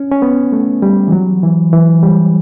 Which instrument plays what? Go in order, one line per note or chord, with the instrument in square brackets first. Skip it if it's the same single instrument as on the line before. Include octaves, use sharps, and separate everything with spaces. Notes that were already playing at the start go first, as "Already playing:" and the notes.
Already playing: [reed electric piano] C#4
C#4
B3
A3
G3
E3
F#3
E3
E3
G3